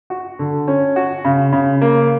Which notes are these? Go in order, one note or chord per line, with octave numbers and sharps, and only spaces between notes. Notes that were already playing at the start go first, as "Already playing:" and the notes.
F#4
D3
C#4
F#4
C#3
C#3
A#3